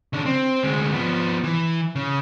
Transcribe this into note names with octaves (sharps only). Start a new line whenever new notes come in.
C#3 D4
C4
D2 G#3
F3 B3
E3
C#3